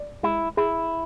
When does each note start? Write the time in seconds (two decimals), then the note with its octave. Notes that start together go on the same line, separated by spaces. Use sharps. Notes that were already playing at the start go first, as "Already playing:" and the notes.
Already playing: D5
0.23 G#3 E4
0.57 E4 G#4